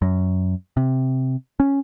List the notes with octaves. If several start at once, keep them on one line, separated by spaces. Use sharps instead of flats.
F#2
C3
C#4